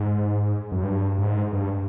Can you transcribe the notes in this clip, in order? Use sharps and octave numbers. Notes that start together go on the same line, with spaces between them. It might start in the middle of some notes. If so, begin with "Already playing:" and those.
Already playing: G#2
F#2
G2
G#2
G2